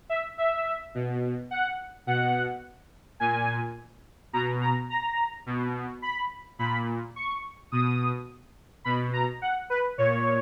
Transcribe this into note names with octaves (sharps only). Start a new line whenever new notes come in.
E5
E5
B2
F#5
B2 F#5
A#2 G#5
B2 A#5
A#5
A#5
B2
B5
A#2 B5
C#6
B2 D#6
B2 B5
A#5
F#5
B4
A#2 C#5